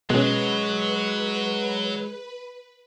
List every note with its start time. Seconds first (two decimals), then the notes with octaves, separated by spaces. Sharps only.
0.10 B2 F#3 G#3 C#4 B4